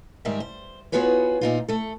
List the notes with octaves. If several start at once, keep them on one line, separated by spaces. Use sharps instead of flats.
G#2 D#3 G3 A#4 E5
C5
B3 F4 F#4 G#4 B4 C#5
A#2 D#4 F4
A3 A4